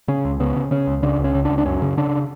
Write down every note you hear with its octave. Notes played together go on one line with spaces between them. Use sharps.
C#3 C#4
C#2
C#3 B3
C#3
C#3 C#4
C#2
C#3 D4
C#2
C#4
C#3
D4
C#2
D4
F#2 C#4
C#3
C#3 D4